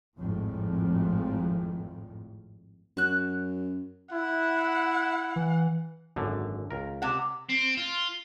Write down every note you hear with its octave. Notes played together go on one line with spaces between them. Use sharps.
G#1 F2 A2
F#2 F#4 F#6
E4 F#5
E3
G#1 F#2 D3
C#2 A#4
C3 F#5
C4
F4